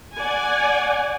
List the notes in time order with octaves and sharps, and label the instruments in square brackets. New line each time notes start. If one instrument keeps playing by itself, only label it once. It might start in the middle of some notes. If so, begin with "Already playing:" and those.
[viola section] D5 F#5 G#5